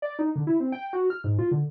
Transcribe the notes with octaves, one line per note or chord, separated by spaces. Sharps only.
D5
D#4
D3
E4
C4
G5
F#4
F6
G#2
F4
D3